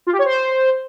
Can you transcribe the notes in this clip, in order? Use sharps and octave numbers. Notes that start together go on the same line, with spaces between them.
F4
G4
C#5
C5